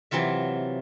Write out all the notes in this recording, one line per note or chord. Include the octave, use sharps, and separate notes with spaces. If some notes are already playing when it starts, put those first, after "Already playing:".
C3 E3 F#3 F4 E5